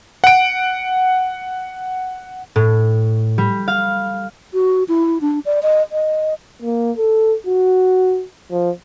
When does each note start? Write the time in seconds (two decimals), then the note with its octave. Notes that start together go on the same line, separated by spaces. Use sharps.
0.24 F#5 D7
2.56 A2
3.38 G3
3.68 F5
4.54 F#4
4.88 E4
5.21 D4
5.45 D5
5.63 D#5
5.92 D#5
6.62 A#3
6.97 A4
7.47 F#4
8.52 F3